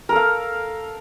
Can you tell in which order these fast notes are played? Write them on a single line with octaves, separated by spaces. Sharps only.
A#4 A4 F5